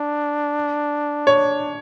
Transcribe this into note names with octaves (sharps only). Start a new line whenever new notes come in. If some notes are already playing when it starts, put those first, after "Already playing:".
Already playing: D4
C#5